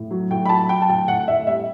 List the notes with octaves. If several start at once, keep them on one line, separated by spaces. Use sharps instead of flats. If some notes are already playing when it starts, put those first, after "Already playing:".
Already playing: A2
F#3
A2 G5
B5
F#3 A5
F#3 G5
A5
A2 G5
A2 F#5
A2 E5
G3 E5